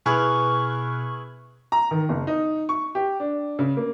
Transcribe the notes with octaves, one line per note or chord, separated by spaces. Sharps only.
B2 E4 G#4 B4 C#6 F6 F#6
A#5
D#3
F#1
D#4
C#6
G4
D4
C#3
A#3